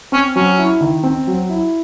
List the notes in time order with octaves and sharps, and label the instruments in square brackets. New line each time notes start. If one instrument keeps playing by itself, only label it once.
[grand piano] C4 [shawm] C#4
[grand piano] F#3 [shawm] C#4
[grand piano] E4
D#3
C4
F#3
E4